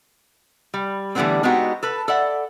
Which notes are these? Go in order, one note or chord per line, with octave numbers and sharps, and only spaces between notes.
G3
D3 E3 G3 A3 B3 C4
G#3 B3 C4 D#4 F#4 G4
A4 B4
A4 D5 E5 F#5